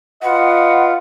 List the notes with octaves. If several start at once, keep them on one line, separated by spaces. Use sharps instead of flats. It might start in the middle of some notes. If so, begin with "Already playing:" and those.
F4 B4 D#5 F#5